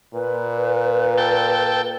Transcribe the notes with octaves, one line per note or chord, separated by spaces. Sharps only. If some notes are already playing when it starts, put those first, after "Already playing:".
A#2 B4
A4 G5